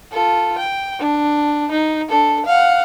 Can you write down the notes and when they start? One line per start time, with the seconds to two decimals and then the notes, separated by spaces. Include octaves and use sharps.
0.12 F4 A4
0.58 G5
0.99 D4
1.71 D#4
2.09 D4 A4
2.46 F5 F#5